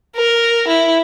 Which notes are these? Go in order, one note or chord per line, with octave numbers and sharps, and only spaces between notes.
A#4
E4